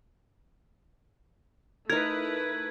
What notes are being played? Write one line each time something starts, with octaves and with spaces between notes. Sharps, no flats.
A3 D#4 E4 A#4 B4 G#6